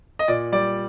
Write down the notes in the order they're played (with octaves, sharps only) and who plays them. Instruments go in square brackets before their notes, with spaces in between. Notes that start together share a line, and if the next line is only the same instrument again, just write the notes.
[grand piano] D#5
A#2 D5
G3 D5